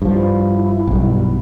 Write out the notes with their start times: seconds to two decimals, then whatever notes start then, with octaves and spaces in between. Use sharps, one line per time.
0.02 G2 F3 E4
0.87 B1 G2